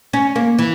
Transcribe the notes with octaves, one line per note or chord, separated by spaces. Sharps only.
C#4
A#3
E3